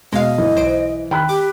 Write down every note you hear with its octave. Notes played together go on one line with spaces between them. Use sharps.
B2 G#3 D#5 F5
G1 E3
B1 C5 D7
D#3 G5 B5 F#6
G4 D6